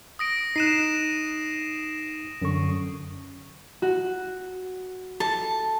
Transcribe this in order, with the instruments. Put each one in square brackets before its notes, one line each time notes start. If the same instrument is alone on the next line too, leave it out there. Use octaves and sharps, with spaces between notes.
[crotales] D#6 A#6 D7
[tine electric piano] D#4 F#6 [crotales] C7 D#7 E7
[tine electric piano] F#2 D3 C#6
[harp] F#4
[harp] A4 [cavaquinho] A5